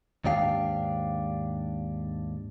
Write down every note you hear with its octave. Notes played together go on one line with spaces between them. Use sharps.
D#2 G#2 D4 G4 F5